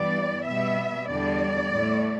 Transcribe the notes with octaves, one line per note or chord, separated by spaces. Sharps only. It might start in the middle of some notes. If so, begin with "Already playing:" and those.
Already playing: G2 E3 G3 B3 D5
B2 G3 B3 E5
E2 D3 G3 D5
A2 A3